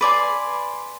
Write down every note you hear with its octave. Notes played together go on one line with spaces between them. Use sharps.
B4 D5 G#5 C6